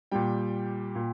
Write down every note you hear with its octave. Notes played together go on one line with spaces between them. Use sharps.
A#2 G3 G5
A#2